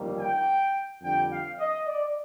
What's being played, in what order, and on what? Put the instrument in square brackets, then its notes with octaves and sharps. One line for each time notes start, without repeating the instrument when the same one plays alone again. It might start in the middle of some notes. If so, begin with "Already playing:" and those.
Already playing: [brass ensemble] G1 F2 D#3 G3 A#3
G5
F2 D3 G3 G5
F5
D#5
D5